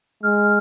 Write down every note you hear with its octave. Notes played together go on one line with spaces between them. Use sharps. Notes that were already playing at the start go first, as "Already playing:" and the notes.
G#3 F6